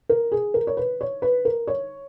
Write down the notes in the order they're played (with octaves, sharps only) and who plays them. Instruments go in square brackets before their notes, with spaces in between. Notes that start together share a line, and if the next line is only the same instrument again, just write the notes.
[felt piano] A#4
G#4
A#4
C#5
B4
C#5
B4
A#4
C#5